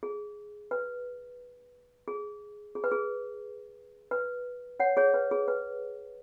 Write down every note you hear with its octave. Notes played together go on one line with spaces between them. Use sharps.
G#4
B4
G#4
G#4
B4
G#4
B4
C#5 F#5
G#4 C#5
B4
G#4
B4